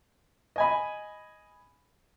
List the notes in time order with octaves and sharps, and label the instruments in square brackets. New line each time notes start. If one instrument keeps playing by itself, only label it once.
[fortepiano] D#5 G#5 B5